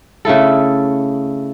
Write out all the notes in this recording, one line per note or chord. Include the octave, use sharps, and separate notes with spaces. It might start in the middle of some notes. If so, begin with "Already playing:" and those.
C#3 A3 E4 A4